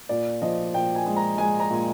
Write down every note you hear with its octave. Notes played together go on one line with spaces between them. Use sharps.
A#2 D5
F3 D#5
A#2 G5
G#5
G#3
A#5
G#3 G#5
A#5
A#2